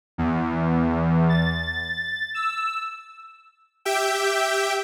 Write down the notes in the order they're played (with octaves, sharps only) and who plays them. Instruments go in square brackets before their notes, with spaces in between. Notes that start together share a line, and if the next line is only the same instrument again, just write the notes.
[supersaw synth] E2
A6
E6
G4 E5 G5